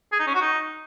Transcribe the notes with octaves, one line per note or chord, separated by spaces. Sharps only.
G#4
D#4
C#4
F#4
D#4